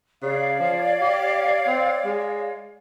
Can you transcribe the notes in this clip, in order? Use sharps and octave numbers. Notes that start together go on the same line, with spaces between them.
C#3 C#5 D5 F5
F3
G4
C4
G#3